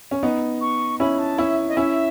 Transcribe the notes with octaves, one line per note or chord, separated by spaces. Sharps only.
C#4
B3 D#4
C#6
C#4 E4 B5
A5
C#4 E4 E5
D#5
C#4 E4 E5